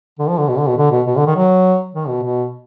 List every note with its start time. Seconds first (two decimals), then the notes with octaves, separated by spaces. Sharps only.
0.19 D3
0.29 F3
0.38 D3
0.48 B2
0.58 D3
0.67 B2
0.78 D3
0.91 B2
1.07 B2
1.16 D3
1.27 D#3
1.36 F#3
1.95 D#3
2.08 B2
2.23 B2